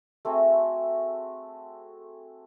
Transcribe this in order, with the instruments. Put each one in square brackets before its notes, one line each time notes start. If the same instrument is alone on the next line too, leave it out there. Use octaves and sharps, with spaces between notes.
[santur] A3 C4 F#4 G#4